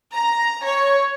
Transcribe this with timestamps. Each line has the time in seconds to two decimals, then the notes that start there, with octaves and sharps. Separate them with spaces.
0.12 A#5
0.63 C#5